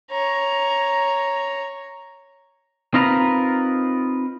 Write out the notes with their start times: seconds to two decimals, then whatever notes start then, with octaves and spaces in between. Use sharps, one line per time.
0.11 C#5 A#5
2.94 C4 D#4 F4 A#4 B4 A#5